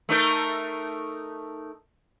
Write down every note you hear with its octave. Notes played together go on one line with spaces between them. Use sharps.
A3 D#4 A#4